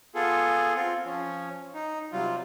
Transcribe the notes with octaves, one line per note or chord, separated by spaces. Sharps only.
B3 F4 G#4 A4
C4 F4
F3 C#4
D#4
C3 F#3 G3 F4